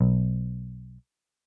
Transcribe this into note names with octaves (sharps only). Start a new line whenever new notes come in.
B1